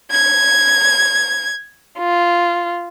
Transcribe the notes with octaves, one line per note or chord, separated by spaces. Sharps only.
G#6
F4